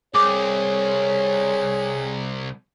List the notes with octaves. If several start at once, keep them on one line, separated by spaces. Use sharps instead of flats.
C2 G#4 C#5 D6